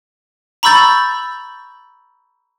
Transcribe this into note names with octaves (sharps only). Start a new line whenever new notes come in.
A#5 B5 C#6 E6 G6 A6